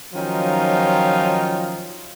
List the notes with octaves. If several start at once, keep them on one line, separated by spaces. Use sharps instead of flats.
D#3 F3 F#3 C#4 D#4 F4